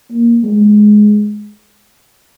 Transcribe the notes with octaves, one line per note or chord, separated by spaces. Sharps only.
A#3
G#3